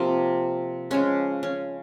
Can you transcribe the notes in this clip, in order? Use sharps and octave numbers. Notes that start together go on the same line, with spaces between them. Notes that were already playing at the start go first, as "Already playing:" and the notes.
Already playing: C3 F3 A#3 F4
C#3 F3 G#3 C#4
C#4